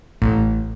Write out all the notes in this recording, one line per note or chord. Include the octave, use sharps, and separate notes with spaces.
A1